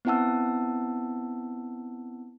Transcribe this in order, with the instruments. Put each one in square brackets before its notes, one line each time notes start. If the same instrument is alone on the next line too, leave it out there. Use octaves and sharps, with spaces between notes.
[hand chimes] B3 C4 E4 F#5 A5 E6